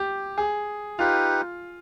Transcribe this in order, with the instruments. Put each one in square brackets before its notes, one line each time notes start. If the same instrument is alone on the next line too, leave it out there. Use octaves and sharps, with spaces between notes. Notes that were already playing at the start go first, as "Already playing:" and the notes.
Already playing: [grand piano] G4
G#4
[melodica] D#4 G4 B4 [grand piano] F4